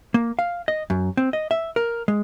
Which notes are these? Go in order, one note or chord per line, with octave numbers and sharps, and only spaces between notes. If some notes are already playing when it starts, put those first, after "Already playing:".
A#3
F5
D#5
F#2
C4
D#5
E5
A#4
G#3